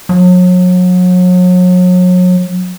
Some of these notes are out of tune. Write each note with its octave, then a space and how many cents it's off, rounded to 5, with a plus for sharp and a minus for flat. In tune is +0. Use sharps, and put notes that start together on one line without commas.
F#3 -35